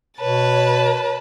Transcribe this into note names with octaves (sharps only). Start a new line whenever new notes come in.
B2 B4 C#5 A5